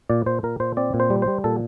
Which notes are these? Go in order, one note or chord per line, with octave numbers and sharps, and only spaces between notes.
A#2 D5
A#2 C5
A#2 A#4
A#2 C5
C4 D5
A#2
C5
G3
C5
G3
A#2 A4